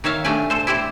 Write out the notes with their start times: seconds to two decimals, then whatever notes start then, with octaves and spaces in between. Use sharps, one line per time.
0.04 D#3 C#5 E5 F5
0.24 A#2 A3 D4 G4 D5 G#5
0.50 A4 C5
0.67 E4 G4 C5 D5